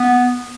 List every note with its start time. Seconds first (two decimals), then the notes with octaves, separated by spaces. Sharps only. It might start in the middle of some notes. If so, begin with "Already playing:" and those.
Already playing: B3